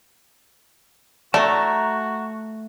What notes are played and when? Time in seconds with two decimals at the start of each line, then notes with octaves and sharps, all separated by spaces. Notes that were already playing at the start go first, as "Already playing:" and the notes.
1.34 A3 D4 F#4 A5 A#5